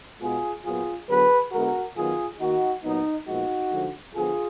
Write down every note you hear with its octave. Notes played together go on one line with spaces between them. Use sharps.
B2 G#3 B3 F4 G#4
A#2 F#3 B3 F4 G#4
D3 F#3 B3 G#4 B4
D3 G#3 B3 F#4 A#4
D#3 F#3 B3 F4 G#4
D#3 A#3 D#4 F#4
A#2 F#3 B3 D#4
A#2 F3 G#3 B3 D#4 F#4
D3 F3 G#3
D3 F3 B3 F4 G#4